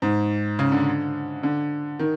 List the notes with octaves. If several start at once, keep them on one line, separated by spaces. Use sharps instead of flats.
G#2
C#3
D3
D3
D#3